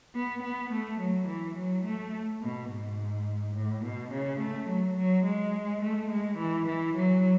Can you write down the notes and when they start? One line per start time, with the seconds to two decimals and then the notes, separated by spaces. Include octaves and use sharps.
0.16 B3
0.44 B3
0.72 A3
1.01 F#3
1.29 E3
1.57 F#3
1.85 A3
2.42 B2
2.70 G#2
3.56 A2
3.85 B2
4.12 C#3
4.41 A3
4.69 F#3
4.97 F#3
5.25 G#3
5.83 A3
6.11 G#3
6.39 E3
6.67 E3
6.96 F#3